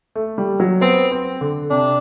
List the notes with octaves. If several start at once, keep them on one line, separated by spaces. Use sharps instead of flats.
A3
G3
F#3
B3 C4
C4
D3
C3 D4